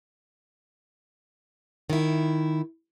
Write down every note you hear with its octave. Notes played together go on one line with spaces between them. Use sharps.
D#3 E4